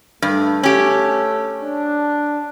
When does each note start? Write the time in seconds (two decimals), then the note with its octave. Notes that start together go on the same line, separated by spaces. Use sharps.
0.22 G2 A3
0.63 C#4 G4
1.60 D4